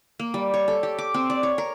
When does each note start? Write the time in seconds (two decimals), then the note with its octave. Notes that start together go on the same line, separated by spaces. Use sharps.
0.19 A#3
0.34 G3
0.54 C#5
0.68 A4
0.83 G4
0.98 D6
1.14 C4
1.30 D5
1.43 C#5
1.58 A#4